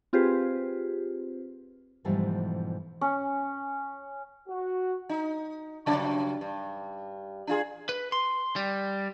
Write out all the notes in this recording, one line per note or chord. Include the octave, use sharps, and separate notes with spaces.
C4 F4 G4 G#4 B4 C5
G#2 B2 E3 F3 G3 A3
C#4
F#4
D#4
G2 C#3 F#3
G2
D4 F4 G#4
B4
C6
G3